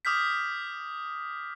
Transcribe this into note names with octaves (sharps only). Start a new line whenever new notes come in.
D6 D#6 F6 G6 B6